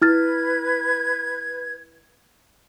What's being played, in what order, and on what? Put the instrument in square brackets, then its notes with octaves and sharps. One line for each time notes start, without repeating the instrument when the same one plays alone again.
[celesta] E4 F6 A6 [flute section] B4 G#6